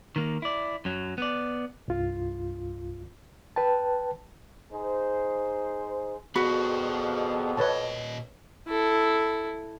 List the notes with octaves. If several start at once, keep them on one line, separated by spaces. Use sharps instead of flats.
D#3 A#3
E4 D5
F#2 F#3
B3 D5
C2 G2 F4
B4 G5 A5
D#4 G#4 C5
F2 B2 B3 F#4 G#4 D5 B5
A#2 B4 C#5 D#5 A5
E4 A4